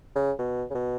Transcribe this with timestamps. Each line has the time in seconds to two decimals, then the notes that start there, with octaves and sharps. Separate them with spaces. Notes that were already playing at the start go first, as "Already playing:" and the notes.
0.15 C#3
0.39 B2
0.70 C#3
0.74 B2